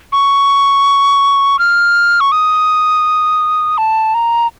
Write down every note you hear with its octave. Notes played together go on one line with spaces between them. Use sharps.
C#6
F6
C#6
D#6
A5
A#5